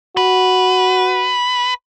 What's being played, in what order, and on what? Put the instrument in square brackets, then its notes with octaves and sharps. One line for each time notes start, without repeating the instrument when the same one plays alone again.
[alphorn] F#4 [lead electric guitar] B4